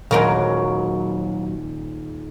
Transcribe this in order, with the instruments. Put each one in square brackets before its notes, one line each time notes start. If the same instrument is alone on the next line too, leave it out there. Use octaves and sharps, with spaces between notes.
[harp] D#1 D#4 [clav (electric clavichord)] G#2 C#3 [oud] F#3 A#4 F5